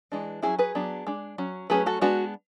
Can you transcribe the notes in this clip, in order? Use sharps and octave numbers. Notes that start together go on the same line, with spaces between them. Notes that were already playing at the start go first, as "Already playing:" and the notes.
E3 G#3 D4
F#3 A3 C#4 E4 G#4
G#4 B4
F#3 B3 D4
G#3 D4
F#3 C#4
F#3 A3 C#4 G#4 B4
F#4 A4
G#3 B3 D4 F#4